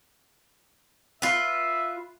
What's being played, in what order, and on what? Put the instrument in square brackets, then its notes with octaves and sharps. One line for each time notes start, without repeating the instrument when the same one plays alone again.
[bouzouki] F4 B4 [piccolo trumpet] E5